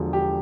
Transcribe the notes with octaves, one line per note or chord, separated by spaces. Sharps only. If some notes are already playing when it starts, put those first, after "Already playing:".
Already playing: E1 E2 D3 F3
G4